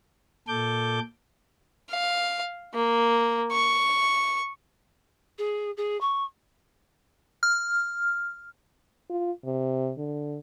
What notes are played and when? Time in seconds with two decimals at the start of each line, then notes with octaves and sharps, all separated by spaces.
0.48 A#2 A4 D6 G6
1.90 F5
2.74 A#3
3.52 C#6
5.38 G#4
5.77 G#4
6.00 C#6
7.43 F6
9.10 F4
9.45 C3
9.98 D3